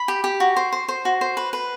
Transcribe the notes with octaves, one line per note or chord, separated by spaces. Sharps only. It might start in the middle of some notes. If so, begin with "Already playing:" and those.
Already playing: B5
G4
G4
F#4
C5
C5
C5
F#4
C5
B4
B4